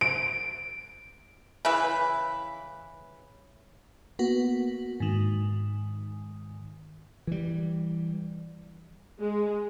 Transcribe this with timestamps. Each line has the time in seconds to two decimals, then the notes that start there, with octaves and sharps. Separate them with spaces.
0.01 D7
1.65 C#3 E3 E4 B4
4.19 A#3 B3 F#4
5.00 G#2 D#3
7.27 E3 G3
9.21 G#3